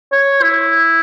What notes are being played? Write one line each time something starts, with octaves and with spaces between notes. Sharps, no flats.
C#5
E4